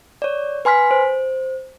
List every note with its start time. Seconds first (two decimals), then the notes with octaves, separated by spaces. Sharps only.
0.22 C#5 D5
0.65 B4 G#5 C6 F6 B6
0.91 C5